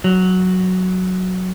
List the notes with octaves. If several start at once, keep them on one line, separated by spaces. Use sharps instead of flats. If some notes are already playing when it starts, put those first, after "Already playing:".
F#3